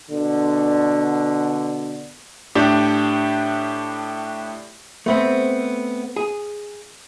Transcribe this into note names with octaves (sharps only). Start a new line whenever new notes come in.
B2 D3
A2 D4 G4
A3 B3 C4
G#4